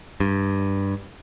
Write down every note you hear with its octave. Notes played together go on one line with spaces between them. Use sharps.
G2